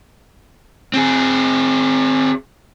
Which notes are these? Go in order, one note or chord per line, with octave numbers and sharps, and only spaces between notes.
C4 G#4